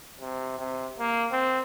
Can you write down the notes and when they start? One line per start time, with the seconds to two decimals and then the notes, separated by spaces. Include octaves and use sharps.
0.21 C3
0.59 C3
0.99 A#3
1.32 C4